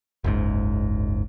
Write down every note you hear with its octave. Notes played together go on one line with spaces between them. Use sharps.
F#1 C#2 G#2